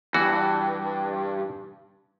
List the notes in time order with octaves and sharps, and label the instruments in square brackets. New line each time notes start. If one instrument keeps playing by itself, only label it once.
[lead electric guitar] E2 G2 [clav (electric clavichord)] E3 F#4